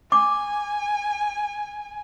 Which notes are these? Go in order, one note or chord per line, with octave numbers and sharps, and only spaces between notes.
G#5 D6